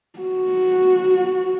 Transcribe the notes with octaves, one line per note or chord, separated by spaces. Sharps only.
F#4